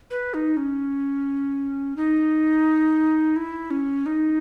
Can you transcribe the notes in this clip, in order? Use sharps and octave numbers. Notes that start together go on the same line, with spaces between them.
B4
D#4
C#4
D#4
E4
C#4
D#4